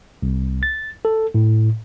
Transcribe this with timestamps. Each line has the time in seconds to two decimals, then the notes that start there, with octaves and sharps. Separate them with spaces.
0.22 C2
0.63 A6
1.05 A4
1.34 A2